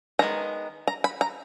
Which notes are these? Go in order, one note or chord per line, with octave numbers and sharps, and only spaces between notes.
D#3 G#3 B3 A#5
A#5
B5
A#5